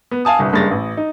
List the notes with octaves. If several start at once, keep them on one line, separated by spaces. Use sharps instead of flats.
B3
F5 G#5 A5 D#6
G1 C2
F#1 G2 G#3 A6 A#6
A1
D#4